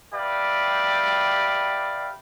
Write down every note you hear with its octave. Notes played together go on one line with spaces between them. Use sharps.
G4 B4 D5 E5 F5 G5